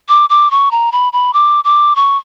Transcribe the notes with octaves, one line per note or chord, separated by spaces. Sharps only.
D6
D6
C#6
A#5
B5
B5
D6
D6
C#6